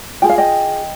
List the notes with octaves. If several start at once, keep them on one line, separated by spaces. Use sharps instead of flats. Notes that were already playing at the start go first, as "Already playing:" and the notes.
F4 G#4 G5
F5
D#5 G5